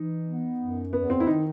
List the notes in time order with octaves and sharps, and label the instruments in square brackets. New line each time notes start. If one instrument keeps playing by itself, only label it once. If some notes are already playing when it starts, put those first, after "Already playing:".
Already playing: [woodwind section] E3 [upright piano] D#4
[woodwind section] B3
F#2
[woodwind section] E2 [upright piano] B3
[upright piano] C4
E4
[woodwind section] D#3 [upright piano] D#4